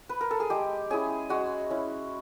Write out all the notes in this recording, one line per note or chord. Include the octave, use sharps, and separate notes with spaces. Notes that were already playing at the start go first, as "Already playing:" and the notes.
B4
A#4
A4
G#4
G#3 G4
C#4 E4 G#4
G#3 F#4
C#4 E4